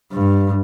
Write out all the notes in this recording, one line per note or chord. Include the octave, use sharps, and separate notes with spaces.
G2